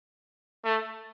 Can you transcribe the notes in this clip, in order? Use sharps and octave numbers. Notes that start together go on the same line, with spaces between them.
A3